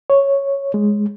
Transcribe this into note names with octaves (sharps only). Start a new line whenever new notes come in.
C#5
G#3